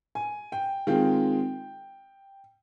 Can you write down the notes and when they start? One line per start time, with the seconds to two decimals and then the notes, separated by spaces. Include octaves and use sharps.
0.15 G#5
0.52 G5
0.87 D#3 G#3 C4 F4 G5